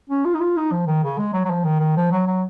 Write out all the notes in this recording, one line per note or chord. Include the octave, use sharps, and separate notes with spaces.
C#4
F4
D#4
F4
D#4
F3
D#3
C#3
G#3
F#3
F#3
F3
D#3
D#3
F3
F#3
F#3